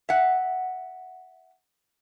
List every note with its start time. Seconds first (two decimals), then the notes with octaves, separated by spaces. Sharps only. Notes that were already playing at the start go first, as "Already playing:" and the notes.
0.09 E5 F#5